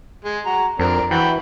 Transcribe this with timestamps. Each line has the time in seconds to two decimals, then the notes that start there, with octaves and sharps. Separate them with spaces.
0.25 G#3
0.46 F#4 A#5
0.79 F2 C4 D4 A#4
1.11 E3 F#4 G5 B5